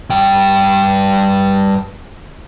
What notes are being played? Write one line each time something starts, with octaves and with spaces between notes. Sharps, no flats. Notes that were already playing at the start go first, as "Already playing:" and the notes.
G2 G5